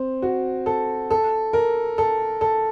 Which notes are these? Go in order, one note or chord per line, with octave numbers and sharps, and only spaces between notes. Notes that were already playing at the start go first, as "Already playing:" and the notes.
Already playing: C4
F#4
A4
A4
A#4
A4
A4